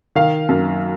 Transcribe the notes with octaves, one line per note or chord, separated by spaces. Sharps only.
D#3 F5
F#2